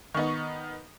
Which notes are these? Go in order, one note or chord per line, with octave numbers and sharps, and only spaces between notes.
D#3 B3 D#4 C#6